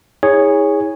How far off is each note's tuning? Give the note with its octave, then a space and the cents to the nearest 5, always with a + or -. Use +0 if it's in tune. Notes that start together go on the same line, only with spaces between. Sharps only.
E4 -45 G#4 -15 C#5 +0